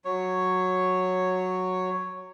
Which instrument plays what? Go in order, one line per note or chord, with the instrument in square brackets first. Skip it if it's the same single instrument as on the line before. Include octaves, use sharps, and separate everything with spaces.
[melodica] F#3 C#5